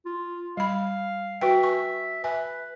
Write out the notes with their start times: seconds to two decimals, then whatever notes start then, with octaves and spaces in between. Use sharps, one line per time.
0.06 F4
0.57 G3 F5 B5
1.41 F#4 B4 E5 G5
1.63 G#5 C#6
2.24 B4 E5 G#5